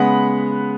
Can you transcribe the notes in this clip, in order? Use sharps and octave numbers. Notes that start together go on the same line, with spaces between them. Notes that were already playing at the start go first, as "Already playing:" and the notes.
Already playing: C#3 G#3 B3 F#5 B5